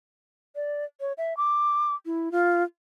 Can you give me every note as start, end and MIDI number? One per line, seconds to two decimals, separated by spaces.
0.56 0.85 74
1.01 1.13 73
1.18 1.36 76
1.37 1.95 86
2.06 2.31 64
2.32 2.63 65